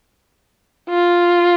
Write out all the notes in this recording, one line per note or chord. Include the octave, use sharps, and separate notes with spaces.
F4